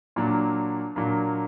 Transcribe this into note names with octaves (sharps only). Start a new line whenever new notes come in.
A#2 F#3 A#3 D4
A#2 F#3 A#3 D4